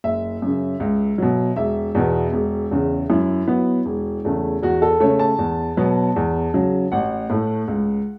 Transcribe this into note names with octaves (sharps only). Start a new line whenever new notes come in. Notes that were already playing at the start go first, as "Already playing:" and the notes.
F#1 E5
F#2 C#3
C#2
B2 F#3
E1 E5
E2 B2 B3
E1
E2 C#3
F#2 E4
F#3 B3
E1
E2 C#3 A3
E2 F#4
A4
C#3 A3 C#5
A5
E2
B2 F#3 B3
E2
C#3 F#3
A1 F#5
A2 A3
C#2